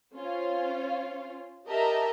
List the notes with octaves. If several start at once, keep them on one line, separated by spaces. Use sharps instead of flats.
C#4 F4 C5
G4 A#4 D#5 E5 A5 A#5